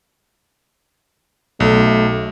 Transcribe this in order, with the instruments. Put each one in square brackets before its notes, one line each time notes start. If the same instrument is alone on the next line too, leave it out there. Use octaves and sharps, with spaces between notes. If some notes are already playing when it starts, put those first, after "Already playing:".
[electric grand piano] B1 [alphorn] A3